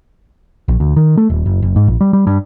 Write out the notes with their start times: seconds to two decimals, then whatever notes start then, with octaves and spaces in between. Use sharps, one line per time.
0.68 A#1
0.80 D2
0.96 D#3
1.17 A3
1.30 D#1
1.46 F#1
1.62 F#1
1.76 G#2
1.87 A#1
2.01 G3
2.13 G3
2.27 G2